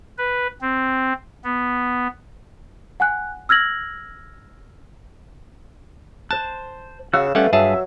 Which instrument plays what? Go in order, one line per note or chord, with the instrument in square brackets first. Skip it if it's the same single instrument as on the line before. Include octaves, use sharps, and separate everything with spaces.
[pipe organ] B4
C4
B3
[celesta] F#5 G#5 F#6
E6 F6 G#6 A#6 F#7
[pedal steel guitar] C5 F#6 [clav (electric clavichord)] A5
[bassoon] C#3 [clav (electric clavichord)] F#4 [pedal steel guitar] F5 E6 F#6
[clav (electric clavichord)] G3 C#4 F#5 [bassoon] A3 [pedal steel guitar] B4 F5
[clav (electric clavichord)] G2 G#4 A5 [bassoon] F#3 [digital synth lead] E5